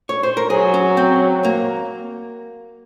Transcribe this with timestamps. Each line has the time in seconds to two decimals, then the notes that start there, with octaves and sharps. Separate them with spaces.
0.09 C#5
0.23 C5
0.37 A#4
0.50 F#3 G#4
0.74 C#4
0.97 C4
1.44 A#3